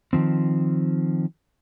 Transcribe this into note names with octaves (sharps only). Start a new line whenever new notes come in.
D#3 F3 C4